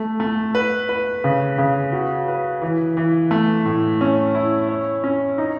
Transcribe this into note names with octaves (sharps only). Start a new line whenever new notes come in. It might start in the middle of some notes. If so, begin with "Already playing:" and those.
Already playing: A3
A3
B4
B4
C#3
C#3
F#4
B4
E3
E3
A3
A2
C#4
E4
C#5
C#4
D#4